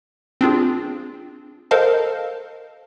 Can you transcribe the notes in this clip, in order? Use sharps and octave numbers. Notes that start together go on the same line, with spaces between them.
C4 D4 F4 G#4
A4 A#4 C5 D#5 F5 A5